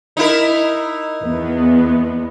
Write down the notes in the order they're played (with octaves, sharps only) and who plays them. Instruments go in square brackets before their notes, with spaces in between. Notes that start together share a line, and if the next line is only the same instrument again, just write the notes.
[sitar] D#4 E4 A#4
[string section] E2 B3